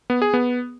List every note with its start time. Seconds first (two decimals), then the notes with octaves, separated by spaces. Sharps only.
0.10 B3
0.22 G#4
0.34 B3